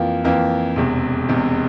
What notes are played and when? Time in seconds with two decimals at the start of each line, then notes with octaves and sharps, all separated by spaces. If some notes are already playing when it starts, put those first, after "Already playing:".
Already playing: F2 E3 A#3 F4
0.24 F2 E3 A#3 F4
0.76 E1 E2 C3
1.29 E1 E2 C3